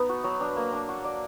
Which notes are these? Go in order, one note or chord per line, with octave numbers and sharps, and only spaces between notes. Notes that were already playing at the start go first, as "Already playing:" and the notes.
Already playing: B3 D#4
F#4
F#3
D4
A#3
D4
F#4
D5